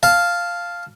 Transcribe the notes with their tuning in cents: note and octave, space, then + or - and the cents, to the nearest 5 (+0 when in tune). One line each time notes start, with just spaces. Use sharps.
F5 +0 A5 -5